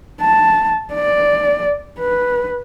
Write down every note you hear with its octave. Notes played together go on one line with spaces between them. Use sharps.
A5
D5
B4